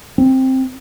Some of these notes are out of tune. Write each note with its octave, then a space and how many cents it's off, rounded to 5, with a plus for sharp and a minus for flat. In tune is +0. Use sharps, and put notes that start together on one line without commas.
C4 +5